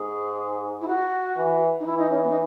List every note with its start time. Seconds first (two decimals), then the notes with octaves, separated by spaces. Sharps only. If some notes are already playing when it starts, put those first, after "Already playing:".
Already playing: G#2 G#4
0.81 E4
0.88 F#4
1.37 E3
1.80 D#4
1.86 E3 E4
1.98 D#4
2.10 C#4
2.23 B3
2.30 D#4